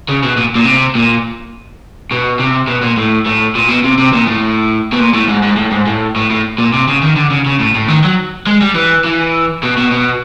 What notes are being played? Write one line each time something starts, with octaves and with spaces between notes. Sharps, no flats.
C#3
B2
A#2
A#2
C3
A#2
B2
C3
B2
A#2
A2
A2
A#2
B2
C3
C3
A#2
A2
B2
A#2
A2
G#2
G#2
A2
G#2
A2
A2
A2
A#2
C3
C#3
D#3
D3
C#3
C#3
A2
A2
D#3
F#3
G#3
G3
E3
E3
B2
B2
B2